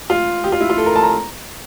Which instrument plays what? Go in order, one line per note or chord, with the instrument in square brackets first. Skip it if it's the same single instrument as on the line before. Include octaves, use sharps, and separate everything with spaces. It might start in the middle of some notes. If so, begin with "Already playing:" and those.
[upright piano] F4
G4
F4
E4
F4
A4
A#4
A5
A#5